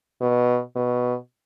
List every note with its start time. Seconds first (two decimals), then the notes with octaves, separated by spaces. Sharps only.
0.21 B2
0.76 B2